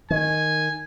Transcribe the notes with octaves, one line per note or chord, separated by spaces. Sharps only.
D#3 G#5